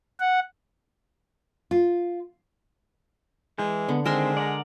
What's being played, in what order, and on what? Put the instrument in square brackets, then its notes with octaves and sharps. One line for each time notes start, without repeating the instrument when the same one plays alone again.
[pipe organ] F#5
[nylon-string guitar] F4
[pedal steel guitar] E3 G6 [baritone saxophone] G#3
[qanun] D3 [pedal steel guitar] B3
[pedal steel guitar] D#3 C4 C5 [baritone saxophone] G#3 [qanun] A#4 E5 C6
[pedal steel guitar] D5 F#5 A#5